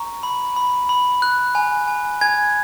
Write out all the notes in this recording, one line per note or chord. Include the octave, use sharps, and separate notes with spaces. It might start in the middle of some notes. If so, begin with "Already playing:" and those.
Already playing: A#5 C#6
B5
B5
B5
F#6
G#5
G#5
G#5 G#6